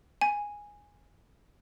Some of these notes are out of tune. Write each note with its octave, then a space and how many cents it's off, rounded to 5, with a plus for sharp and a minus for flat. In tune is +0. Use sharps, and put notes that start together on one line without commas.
G#5 -10